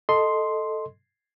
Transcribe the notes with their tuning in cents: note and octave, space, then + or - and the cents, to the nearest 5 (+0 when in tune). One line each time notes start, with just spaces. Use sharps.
A4 +0 D#5 +0 C6 +0